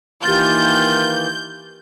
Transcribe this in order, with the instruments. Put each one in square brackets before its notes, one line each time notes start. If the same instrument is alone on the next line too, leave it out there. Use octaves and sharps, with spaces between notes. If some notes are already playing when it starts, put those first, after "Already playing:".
[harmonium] D#3 E3 A#3 [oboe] F4 [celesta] G4 A6 G7 [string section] G6